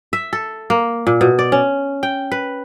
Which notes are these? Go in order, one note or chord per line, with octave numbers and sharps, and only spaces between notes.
E5
A4
A#3
A#2
B2
D5
C#4
G5
B4